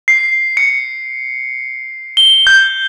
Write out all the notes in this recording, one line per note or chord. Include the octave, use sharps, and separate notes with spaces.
C7
C#7
G7
G6